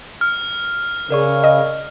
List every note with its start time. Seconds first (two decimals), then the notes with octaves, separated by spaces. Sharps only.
0.21 F6
1.10 C#3 A#4 D5 C#6
1.44 D#5